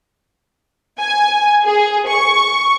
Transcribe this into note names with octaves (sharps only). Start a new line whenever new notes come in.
G#5
G#4
C#6